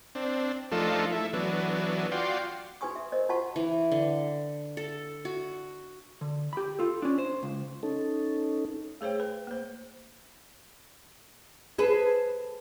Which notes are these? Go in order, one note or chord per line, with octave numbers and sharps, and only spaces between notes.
C4 D4
F3 A3 D4 D#4 F4 A4
A3 E4
E3 F#3 B3 D4
F4 F#4 D5 G5 C6
D#4 F#4 B4 G#5 C#6 D#6
E5
D#4 A#4 C5 D#5
F4 F#4 C5 F#5 A5 C#6
E3
D3
A4
F#4
D3
G4 B5
F4 A4
C#4 D4
C5
C#2
C#4 D#4 A4
A3 G#4 C5 C#5 G5
B4
A#3 C5
G#4 A4 B4